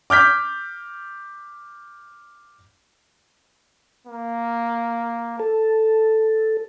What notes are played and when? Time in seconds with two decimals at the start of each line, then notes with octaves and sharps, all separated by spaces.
0.10 D6 F6 G6 B6
4.07 A#3
5.40 A4 A5